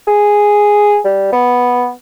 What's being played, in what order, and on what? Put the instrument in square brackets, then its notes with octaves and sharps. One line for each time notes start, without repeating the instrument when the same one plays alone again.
[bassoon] G#4
G3
B3